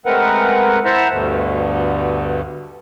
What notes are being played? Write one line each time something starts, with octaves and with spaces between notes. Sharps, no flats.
G#3 A3 C4 A#4 B4 F#5
E4 C5 E5 F#5 A5 A#5
D2 G2 B2 D3